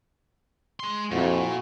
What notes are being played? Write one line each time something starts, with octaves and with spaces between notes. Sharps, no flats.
G#3 C6
F2 A#2 E4 F#4